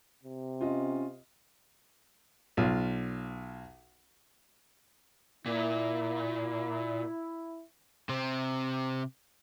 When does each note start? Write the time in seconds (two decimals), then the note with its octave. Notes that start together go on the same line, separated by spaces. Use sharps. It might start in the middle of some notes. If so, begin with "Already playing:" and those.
0.23 C3
0.61 C#4 F4 D#5
2.57 B1 F4
5.46 A#2 E4
8.09 C3 C4